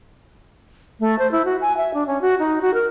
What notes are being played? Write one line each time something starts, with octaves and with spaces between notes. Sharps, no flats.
A3
C5
E4
F#4
G#5
E5
D4
C#4
F#4
D#4
F#4
A#4